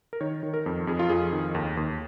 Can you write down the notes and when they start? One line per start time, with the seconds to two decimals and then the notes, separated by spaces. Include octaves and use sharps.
0.13 A#4
0.21 D#3 C#5
0.43 D#3
0.54 A#4
0.66 F2
0.87 F2 G#4
0.99 F4
1.09 F2 G#4
1.32 D#3
1.55 D#2
1.77 D#2